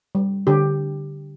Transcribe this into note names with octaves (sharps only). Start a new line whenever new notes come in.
G3
D3 G4